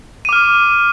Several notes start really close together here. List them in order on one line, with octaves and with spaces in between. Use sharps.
D#7 D6 F6